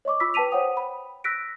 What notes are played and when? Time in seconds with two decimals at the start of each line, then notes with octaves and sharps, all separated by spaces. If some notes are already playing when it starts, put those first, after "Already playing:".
0.05 C#5 D#5 C#6 D6
0.20 F4 B5 D6 E6 B6
0.34 B4 G5 A5 B6 D#7 F7
0.52 C5 C#5 F#5 G5 D#6
0.77 B5
1.24 E6 F#6 A#6 B6 D7